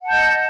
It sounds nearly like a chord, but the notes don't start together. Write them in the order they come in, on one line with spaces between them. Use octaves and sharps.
F#5 A5 G6 D#5